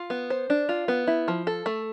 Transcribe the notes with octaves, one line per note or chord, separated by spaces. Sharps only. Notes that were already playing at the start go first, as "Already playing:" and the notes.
Already playing: F4
B3
C5
D4
F4
B3
E4
F3
A4
A3